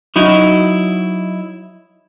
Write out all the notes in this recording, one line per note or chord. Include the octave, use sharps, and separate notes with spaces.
F#3 D#4 E4